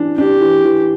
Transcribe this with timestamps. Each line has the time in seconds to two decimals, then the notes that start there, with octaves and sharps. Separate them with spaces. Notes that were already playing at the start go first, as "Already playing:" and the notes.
Already playing: E3 D4
0.17 D4 G4
0.41 E3
0.65 E3